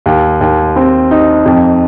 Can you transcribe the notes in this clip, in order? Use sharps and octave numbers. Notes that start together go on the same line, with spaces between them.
D#2
D#2
C4
D#4
F2